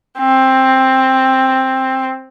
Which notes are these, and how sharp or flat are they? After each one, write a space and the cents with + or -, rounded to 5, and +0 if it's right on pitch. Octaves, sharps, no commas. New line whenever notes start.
C4 +10